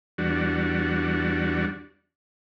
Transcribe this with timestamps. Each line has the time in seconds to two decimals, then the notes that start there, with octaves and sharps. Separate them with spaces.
0.18 E2 G3 D4 F#4